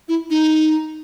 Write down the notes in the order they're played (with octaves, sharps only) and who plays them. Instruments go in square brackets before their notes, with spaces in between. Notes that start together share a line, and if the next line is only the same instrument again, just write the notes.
[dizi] E4
D#4